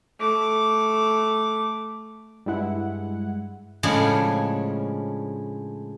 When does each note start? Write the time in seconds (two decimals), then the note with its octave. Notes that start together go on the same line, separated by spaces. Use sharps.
0.19 A3 D6
2.46 G2 G#3 E4 F#5
3.83 A2 C#3 F3 G#3 D4